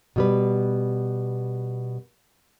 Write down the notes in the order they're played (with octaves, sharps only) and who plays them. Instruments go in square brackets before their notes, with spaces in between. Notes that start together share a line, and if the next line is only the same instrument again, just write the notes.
[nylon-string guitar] B2 G3 B4